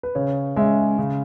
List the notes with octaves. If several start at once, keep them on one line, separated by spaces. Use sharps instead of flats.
B4
C#3 C#5
G#3 C#4 E5
C#3